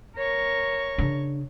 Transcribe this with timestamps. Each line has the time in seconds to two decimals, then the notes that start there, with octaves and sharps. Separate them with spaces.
0.17 A#4 C#5 C#6
0.98 C#3 D4